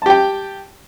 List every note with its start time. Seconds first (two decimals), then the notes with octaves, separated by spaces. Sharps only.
0.02 A5
0.06 G4
0.10 G5